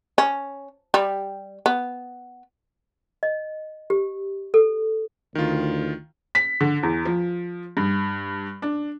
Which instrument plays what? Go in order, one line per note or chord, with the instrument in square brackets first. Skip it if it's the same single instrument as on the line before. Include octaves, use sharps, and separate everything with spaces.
[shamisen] C#4
G3
B3
[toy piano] D#5
G4
A4
[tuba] D2 [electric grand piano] D#3 F4
[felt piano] B6
D3
E2
F3
G2
D4